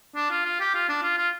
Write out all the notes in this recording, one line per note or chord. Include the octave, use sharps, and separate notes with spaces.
D4
F4
F4
G4
F4
D4
F4
F4